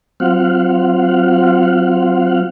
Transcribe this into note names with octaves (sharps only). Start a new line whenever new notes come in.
F#3 C4 F4 F5 F#5